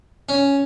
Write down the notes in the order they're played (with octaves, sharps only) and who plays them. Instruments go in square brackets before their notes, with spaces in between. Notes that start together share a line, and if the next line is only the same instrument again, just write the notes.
[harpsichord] C#4